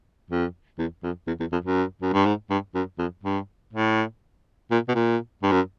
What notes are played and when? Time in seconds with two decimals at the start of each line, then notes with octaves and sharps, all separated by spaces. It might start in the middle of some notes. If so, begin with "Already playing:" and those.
0.30 F2
0.78 E2
1.03 F2
1.27 E2
1.40 E2
1.52 F2
1.65 F#2
2.02 F#2
2.13 G2
2.26 G#2
2.50 G2
2.75 F#2
2.98 F2
3.24 G2
3.73 A2
4.71 A#2
4.88 B2
4.95 A#2
5.43 G2
5.52 F#2